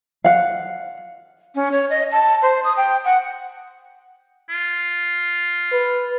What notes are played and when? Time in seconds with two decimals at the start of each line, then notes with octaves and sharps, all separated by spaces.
0.24 F5 F#5
1.55 C#4
1.72 C#5
1.90 D#5
2.12 A5
2.42 C5
2.64 D#6
2.77 G5
3.05 F#5
4.49 F4
5.72 B4